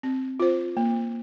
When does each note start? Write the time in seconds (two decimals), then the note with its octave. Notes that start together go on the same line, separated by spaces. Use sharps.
0.03 C4
0.40 F4 C5
0.77 A#3